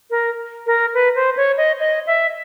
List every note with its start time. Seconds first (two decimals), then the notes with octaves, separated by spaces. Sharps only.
0.10 A#4
0.67 A#4
0.94 B4
1.15 C5
1.37 C#5
1.57 D#5
1.80 D#5
2.07 E5